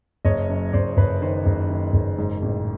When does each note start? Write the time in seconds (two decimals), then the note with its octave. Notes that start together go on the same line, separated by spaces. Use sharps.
0.25 F#1 C#5 D#5
0.49 F#2
0.73 F#1 C5 D5
0.97 F#1 B4 C#5
1.21 D#3 C5
1.46 F#1
1.69 D#3
1.93 F#1
2.18 G#2
2.42 A1